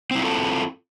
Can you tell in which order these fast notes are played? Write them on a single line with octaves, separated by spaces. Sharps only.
C4 E4 F4 A4